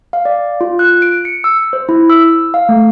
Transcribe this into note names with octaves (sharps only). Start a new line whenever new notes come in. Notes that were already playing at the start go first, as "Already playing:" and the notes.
F5
D5
F4
F#6
D7
C#7
E6
C5
E4
E6
F5
A3